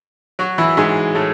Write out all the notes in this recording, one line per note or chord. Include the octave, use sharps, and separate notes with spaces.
F#3 F#4
E3 E4
G#2 G#3
A2 A3